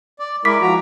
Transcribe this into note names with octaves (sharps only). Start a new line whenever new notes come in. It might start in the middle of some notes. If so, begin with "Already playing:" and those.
D5
G#3 E4 A#4 D6 B6
F3 F#4 A#5